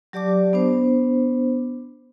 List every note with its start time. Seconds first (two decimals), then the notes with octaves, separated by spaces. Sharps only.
0.13 F#3 G4 D5 A5 D6
0.53 B3 D4 C5